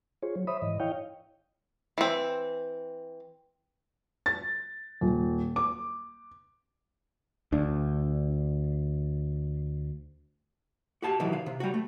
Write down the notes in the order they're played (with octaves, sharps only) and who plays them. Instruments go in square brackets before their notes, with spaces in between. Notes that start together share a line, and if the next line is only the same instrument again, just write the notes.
[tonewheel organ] F4 G#4 C5 C#5
F#3
C5 C#5 E5 B5 D#6
G#2 E3 D#5
E4 C#5 D#5 F5 G5
[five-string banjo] E3 C4
[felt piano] A6
D#1
D6
[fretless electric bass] D2 D4
[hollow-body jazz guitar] F#4 G4 A5
B2 D#3 E3 F#3
F5
C3
G3 F#4
A3